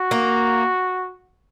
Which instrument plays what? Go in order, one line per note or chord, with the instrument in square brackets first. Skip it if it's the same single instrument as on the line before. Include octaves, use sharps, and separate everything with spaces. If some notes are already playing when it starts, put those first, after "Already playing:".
Already playing: [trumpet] F#4
[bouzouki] A#3